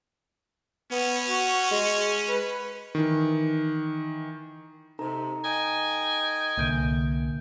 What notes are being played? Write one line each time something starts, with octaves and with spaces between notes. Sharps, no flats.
B3 C#4
F#4
G#3
B4
D#3 E3
C3 D#4 A4 A#5
D#5 G5 G#5
C2 A#2 D3 A#3 G6 D7